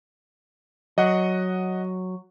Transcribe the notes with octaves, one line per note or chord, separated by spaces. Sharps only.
F#3 D#5 F#5